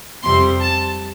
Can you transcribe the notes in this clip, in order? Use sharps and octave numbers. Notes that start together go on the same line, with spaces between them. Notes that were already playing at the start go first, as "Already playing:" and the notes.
F2 C3 G3 C4 C6
A5